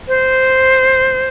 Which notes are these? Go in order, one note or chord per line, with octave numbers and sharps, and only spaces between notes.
C5